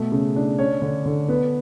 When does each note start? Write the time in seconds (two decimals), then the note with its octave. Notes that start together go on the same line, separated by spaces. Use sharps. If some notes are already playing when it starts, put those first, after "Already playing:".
Already playing: B2 A3
0.12 C#3
0.36 D4
0.59 C#4 C#5
0.82 D3
1.06 D3
1.29 B3 B4